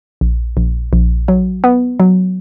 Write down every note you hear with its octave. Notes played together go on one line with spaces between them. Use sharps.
A#1
A#1
A#1
F#3
B3
F#3